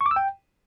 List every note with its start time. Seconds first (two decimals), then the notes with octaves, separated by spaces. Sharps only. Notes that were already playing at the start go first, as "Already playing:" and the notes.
0.01 C#6
0.06 D6
0.11 E6
0.16 G5